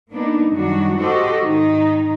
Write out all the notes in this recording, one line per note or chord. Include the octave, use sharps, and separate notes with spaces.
A#3 B3 D4 D#4
F#2 D#3 G3 D4 F#4
F#4 G4 A4 C5 D#5
G#2 D#3 D#4